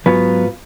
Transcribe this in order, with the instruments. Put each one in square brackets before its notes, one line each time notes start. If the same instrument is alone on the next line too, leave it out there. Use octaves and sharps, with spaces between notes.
[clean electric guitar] G#2 F#3 B3 F4 B4